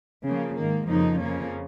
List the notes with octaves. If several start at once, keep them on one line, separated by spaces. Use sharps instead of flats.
C#3 F3 A#3
G#2 D#3 A#3
F2 C#3 F3 A#3 D#4
F2 C#3 F3 A#3 C#4